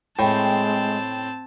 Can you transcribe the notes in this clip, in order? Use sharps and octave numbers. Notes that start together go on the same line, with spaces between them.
A2 G#3 C4 G5 A5